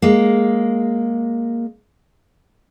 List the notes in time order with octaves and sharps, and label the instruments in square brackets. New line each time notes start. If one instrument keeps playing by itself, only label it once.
[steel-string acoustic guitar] G#3 A#3